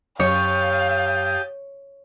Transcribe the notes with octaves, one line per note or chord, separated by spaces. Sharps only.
F#2 G4 C#5 F5 A5 D#6